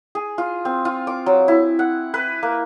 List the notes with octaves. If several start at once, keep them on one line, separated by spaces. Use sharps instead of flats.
G#4
F4
C4
F4
D6
F#3
E4
F#5
B4
A#3